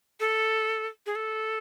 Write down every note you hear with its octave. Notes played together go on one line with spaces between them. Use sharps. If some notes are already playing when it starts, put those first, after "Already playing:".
A4
G#4
A4